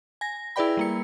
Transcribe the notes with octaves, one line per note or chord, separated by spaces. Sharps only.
G#5 A#6
E4 G#4 B4 D5 G5 B5
G3 A#3 C#7